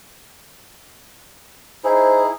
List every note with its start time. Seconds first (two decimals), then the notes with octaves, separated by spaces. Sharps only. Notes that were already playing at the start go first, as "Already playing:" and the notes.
1.84 D#4 E4 G#4 C5